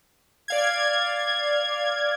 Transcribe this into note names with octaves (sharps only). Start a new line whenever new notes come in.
D5 F5 G#6